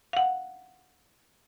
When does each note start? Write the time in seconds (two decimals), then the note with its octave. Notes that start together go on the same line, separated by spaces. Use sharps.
0.13 F5 F#5